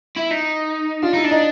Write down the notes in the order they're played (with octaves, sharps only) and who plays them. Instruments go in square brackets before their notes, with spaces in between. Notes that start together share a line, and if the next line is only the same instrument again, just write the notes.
[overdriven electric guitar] E4
D#4
[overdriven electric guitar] D4 [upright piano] F4
[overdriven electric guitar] D#4 [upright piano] E4
[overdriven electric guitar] D4
[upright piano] D#4